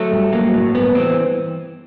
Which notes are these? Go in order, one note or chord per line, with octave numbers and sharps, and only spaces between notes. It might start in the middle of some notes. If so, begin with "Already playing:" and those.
Already playing: F#3 A3
G2
F#3 A#3
A2
G2 B3
E3 C4